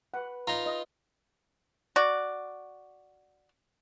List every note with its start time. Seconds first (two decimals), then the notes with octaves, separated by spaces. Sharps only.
0.14 B4 F#5
0.47 D#4 F4 A#5
0.66 D#5
1.96 F#4 D5